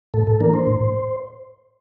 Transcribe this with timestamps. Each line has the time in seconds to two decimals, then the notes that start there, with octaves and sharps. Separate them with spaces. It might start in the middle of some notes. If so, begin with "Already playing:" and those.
0.14 A2 A4
0.27 A4
0.40 E3 A#3 D4 A#4
0.54 C5
0.67 A2